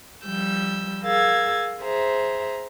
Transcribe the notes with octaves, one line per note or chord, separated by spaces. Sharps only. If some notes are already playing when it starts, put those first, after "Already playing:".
F3 G3 E6 G6
G#4 A#4 F5 E6 G#6 A6
G#4 C5 E5 A#5